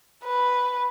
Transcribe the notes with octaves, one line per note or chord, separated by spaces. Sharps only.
B4